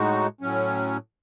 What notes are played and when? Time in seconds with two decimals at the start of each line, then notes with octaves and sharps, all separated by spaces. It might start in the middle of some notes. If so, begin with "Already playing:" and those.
Already playing: A2 G#3 D#4 F#4
0.41 A2 F#3 C#4